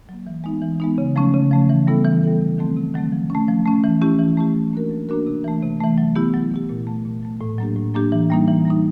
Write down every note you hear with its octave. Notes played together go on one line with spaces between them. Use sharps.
F#3 A#3
E3
G#3 B3 D#4
E3
G#3 B3 D#4
C#3
F3 A3 C#4
C#3
F3 A3 C#4
E3
G3 B3 E4 A4
E3
G3 B3 E4 A4
C3
D#3 F#3 A3 C4
C3
D#3 F#3 A3 C4
F3
A3 C#4
F3
A3 C#4
E3
A3 C#4 E4 G4
E3
A3 C#4 E4 G4
F#3
A#3 D4 F#4 A#4
F#3
A#3 D4 F#4 A#4
C3
E3 A3
C3
E3 A3
F#3
B3 E4 G4
F#3
B3 E4 G4
A#2
F#3 A3
A#2
F#3 A3
A2
F#3 A#3 D4 G4
A2
F#3 A#3 D4 G4
E3
G3 A#3 D#4
E3
G3 A#3 D#4